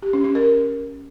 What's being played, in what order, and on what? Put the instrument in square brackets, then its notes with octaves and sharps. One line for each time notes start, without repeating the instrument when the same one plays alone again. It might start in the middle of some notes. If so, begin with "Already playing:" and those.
[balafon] G4
C#4
C#4
A#4